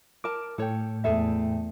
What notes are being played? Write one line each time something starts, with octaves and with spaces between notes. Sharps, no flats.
A#4 A5 D6
A2 A4 C#5 G5
E2 A3 G#4 A4 E5